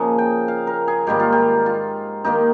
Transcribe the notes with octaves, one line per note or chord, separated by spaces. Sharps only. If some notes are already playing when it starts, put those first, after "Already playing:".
Already playing: C#3 F3 A#3 D#5
G5
F5
A#4
G#4
G#2 D#3 G3 A#3 G4
F4
G4
F4
D#3 A#3 D#4 G4